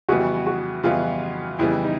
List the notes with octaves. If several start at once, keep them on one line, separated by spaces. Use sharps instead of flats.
F2 C#3 E3 G3 B3 F#4
F#4
F2 C#3 E3 G3 B3 F4
F2 C#3 E3 G3 B3 E4
D#4